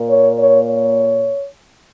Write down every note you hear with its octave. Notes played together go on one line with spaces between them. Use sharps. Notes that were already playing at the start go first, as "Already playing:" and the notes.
Already playing: A#2 A#3
C#5
C#5
C#5